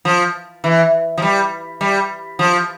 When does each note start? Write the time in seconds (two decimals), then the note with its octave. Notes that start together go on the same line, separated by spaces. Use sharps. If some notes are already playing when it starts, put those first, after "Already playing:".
0.05 F3
0.64 E3
1.18 F3
1.22 G3
1.81 G3
2.39 F3